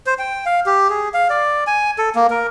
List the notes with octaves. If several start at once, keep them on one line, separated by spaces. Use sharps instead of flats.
C5
G5
F5
G4
G#4
F5
D5
G#5
A4
A#3
A#4